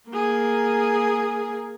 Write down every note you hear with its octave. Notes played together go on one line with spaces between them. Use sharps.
A#3 G#4